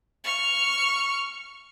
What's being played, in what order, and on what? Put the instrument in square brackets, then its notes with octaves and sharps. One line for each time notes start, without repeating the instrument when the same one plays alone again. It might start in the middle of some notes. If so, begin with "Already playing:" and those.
[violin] C#6 F6